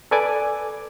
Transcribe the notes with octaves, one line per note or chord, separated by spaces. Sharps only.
A4 B4 D5 G#5 D6